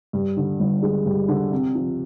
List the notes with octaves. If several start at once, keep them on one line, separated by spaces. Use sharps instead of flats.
G2
D3
G1
G#3
G2
D3
C3
F3